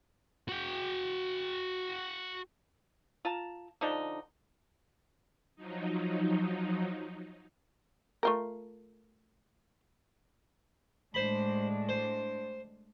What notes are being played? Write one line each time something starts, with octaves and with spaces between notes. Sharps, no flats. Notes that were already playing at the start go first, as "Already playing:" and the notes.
F#4 G5
F4 A5 A#5
D3 F3 D4 D#4
F3 F#3 D#4
A3 F4 A#4
A2 G#3 D4 C5 B5
C5